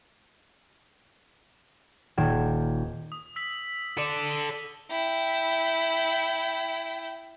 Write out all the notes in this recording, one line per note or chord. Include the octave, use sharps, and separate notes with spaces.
D#1 G5 G#6 E7
D#6
E6 B6 F#7
A4 D5 D#7 E7
D#7 G7
E4 G5